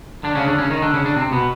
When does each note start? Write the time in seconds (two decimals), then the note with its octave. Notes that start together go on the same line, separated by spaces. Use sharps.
0.24 D3 D4
0.35 C#3 C#4
0.47 D3 D4
0.58 C#3 C#4
0.70 D#3 D#4
0.82 D3 D4
0.94 C#3 C#4
1.05 D3 D4
1.17 C3 C4
1.32 B2 B3